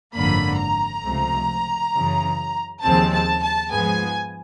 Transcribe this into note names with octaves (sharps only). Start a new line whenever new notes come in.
G#1 F#2 D3 F3 A#3 B5
A#5
C#2 C3 F3 A3
F#2 C#3 E3
D#2 C#3 F3 G#3 C4 A5
A5
A5
G#2 F3 G#3 B3 G#5